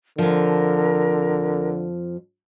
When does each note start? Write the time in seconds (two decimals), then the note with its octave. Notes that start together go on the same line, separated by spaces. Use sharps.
0.18 F2 D3 F3 A#4